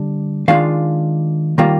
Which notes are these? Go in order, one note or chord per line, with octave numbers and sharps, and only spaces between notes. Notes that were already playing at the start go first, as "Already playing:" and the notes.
Already playing: D3 G3 D4
D#3 G#3 D4 F4 F5
D#3 G3 A#3 F4